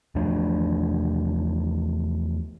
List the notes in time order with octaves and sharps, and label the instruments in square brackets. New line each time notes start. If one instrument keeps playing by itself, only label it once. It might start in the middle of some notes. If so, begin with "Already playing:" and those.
[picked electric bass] E2 F3 A3 D4